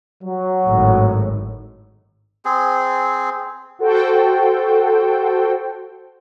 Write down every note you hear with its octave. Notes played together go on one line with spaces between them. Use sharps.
F#3
G#1 A2
C4 G#4
F#4 A4 C5 G5